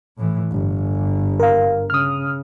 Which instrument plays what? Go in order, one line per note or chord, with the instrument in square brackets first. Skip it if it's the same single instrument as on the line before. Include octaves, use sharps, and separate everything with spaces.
[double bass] A2 E3
G1
[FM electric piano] A#4 F5
[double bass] C#3 [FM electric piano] D#6 F6